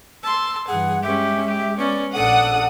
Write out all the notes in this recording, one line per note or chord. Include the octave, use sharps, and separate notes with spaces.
A5 C6 E6
G2 E3 G#4 F#5
G#3 C#4 G4 E5
G4
B3 C#4 D5
A#1 A#2 D4 A4 F#5 D#6